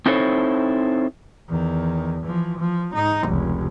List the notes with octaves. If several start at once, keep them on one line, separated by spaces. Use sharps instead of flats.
C4 D#4 E4 A4 C5 C#5
E2 D#3
E3 F3
F3
G#2 D#4
F1 C#2